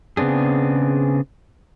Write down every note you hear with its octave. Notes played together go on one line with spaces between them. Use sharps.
C#3 B3 C4 D4 G#4